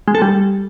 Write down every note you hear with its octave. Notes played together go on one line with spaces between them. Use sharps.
G#3
A4
G3